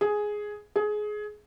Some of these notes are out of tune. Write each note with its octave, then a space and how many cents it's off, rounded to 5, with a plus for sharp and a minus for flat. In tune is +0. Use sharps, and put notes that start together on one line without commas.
G#4 +5
G#4 +20